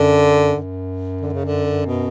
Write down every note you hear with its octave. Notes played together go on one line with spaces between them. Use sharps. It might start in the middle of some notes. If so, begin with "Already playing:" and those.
Already playing: F#2 D3
F#2
D3
C#3
D3
B2